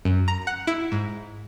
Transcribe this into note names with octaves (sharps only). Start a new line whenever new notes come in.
F#2
A#5
F#5
E4
G#2